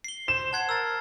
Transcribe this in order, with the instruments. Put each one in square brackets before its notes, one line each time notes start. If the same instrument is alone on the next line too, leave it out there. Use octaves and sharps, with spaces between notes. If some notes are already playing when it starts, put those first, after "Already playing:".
[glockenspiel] C7 G7
[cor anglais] C5 [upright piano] E7
[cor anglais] F#5 [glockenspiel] A5 G#6 C7
[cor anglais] A#4 [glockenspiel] E6 A6